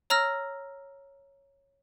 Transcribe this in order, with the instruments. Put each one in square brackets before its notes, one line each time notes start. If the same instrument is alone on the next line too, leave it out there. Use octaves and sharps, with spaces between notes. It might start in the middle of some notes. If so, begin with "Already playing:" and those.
[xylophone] C#5 A#5 E6 F6 A#6